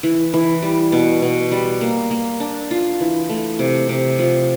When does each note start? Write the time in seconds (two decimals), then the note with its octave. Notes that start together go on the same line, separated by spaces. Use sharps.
0.03 E3
0.34 E3
0.62 G3
0.92 B2
1.22 B2
1.51 G3
1.81 A#3
2.11 A#3
2.40 D4
2.71 F4
3.00 E3
3.29 A3
3.59 C3
3.89 C3
4.19 F3